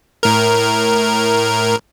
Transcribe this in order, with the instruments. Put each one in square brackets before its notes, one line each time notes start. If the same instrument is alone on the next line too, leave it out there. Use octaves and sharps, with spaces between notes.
[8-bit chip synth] A2 A#4